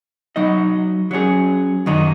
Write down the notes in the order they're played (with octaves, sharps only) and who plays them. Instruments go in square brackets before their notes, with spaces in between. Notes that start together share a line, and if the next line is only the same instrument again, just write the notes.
[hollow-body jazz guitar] F#3 D#4 F#4 D#5
F#3 C#4 G#4
F#2 D#3 F#3 D#4